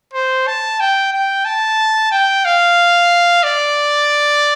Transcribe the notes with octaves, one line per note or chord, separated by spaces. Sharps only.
C5
A5
G5
G5
A5
G5
F5
D5